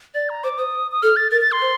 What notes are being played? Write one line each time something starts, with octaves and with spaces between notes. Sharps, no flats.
D5 A6
A#5
C5 D6
C5 D#6
D#6
A4 F6
A6
A#4 A6
A6
C6
C5